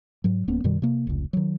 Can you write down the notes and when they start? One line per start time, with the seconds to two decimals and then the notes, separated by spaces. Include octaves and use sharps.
0.24 G#2 F#3
0.48 D1 A#3 B3 C#4
0.64 F#2 B2 D#3 G3
0.82 C3 A#3
1.07 F1 C#2
1.33 D#3 F#3